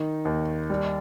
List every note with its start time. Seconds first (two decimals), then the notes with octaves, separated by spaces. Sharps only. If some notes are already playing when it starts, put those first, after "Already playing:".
Already playing: D#3 D#4
0.25 D#2
0.70 G3